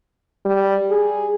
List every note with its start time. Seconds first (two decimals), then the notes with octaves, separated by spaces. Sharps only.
0.45 G3
0.90 G#4